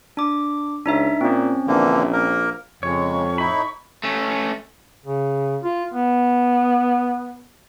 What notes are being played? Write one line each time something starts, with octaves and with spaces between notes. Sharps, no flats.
D4 D6
C#2 D4 D#4 E5
A#2 C4 C#4
A#1 D3 E3 A#3
A#3 A#4
F2 C#3 G#3 C#5 C#6
A2 D#4 E4 B5
A3 C#4
C#3
F4
B3